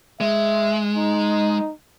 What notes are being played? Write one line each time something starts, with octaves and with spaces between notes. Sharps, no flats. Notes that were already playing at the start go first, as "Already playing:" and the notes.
G#3 E5
D#4